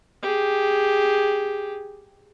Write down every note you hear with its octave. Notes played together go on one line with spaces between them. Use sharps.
G4 G#4